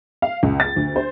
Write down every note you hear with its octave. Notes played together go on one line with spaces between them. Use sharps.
F5
C#2
A6
D2
C5